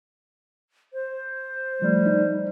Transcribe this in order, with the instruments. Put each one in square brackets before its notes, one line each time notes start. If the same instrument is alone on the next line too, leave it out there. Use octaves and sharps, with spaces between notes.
[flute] C5
[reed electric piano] F3 A3 [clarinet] G3
[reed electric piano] D#4